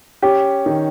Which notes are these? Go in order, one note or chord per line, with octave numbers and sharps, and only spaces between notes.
C#4 G4
D#3